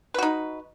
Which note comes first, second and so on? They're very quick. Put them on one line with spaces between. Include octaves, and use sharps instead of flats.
B4 F#4 D#4